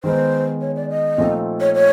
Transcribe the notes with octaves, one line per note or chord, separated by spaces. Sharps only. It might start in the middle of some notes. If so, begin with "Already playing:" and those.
D#3 G#3 B3 D#4 C5
C#5
D5
D#5
A#2 F3 A3 C4 D#4
C#5
C#5